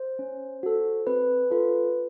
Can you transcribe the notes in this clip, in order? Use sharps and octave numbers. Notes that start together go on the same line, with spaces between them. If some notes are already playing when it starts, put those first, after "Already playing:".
Already playing: C5
C#4
F#4 A4
C4 B4
F4 A4 B4